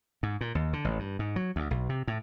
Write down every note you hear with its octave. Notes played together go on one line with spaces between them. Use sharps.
G#2
A#2
D#2
D3
A1
G2
G#2
F#3
D2
B1
C3
A2